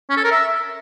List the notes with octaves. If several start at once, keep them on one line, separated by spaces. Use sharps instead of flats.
C#4
A4
A#4
E5